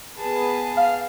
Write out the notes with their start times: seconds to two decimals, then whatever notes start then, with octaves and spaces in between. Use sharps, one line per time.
0.19 B3 G#4 B4 A5
0.77 F5